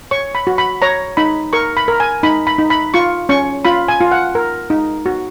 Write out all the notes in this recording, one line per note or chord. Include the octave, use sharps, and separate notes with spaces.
C#5 C#6
B5
F#4
B5
C#5 A#5
D#4 B5
A#4 C#6
B5
A#4
G#5
D#4 B5
B5
D#4
B5
F4 C#6
C#4 C#6
F4 B5
G#5
F4
F#5
A#4
D#4
F#4